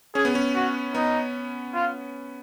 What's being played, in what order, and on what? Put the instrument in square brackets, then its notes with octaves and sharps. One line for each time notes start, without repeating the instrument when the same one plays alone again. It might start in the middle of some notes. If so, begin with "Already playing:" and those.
[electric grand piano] C#4 [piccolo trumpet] G#4
[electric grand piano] B3
C#4
[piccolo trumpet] F#4
[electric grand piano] B3 [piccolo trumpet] D#4
[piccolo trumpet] F4